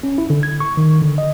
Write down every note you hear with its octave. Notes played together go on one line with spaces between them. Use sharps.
C#4
E4
D3
G#6
C#6
D#3
D3
D#5